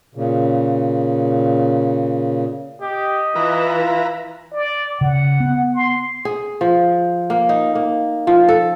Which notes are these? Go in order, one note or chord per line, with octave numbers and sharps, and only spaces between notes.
A#2 C#3
G4 D#5
E3 E4 F4 B4 A#5
D5
C#3 F#5
B3
C6
G#4
F3
A#3
D#4
A#3
F3
A4